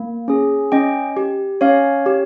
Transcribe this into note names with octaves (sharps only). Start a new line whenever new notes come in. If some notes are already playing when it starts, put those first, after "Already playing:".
Already playing: A#3
C#4 G#4
C#4 D#5 G5
G4
C#4 C#5 F5
G4